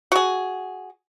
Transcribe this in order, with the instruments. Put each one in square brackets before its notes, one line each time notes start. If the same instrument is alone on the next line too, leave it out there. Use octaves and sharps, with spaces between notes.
[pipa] F#4 G#4